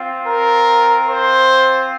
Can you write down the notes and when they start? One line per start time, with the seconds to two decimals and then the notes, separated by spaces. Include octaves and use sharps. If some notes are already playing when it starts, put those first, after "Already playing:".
Already playing: C4 F4
0.27 A#4
1.08 C5